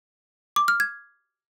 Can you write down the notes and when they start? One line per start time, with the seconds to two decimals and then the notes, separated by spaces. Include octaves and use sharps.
0.56 D6
0.68 F6
0.80 G#6